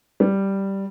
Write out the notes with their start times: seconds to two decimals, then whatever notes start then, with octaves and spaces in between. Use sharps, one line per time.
0.20 G3